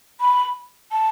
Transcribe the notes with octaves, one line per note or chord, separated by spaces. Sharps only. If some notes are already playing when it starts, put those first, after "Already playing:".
B5
A5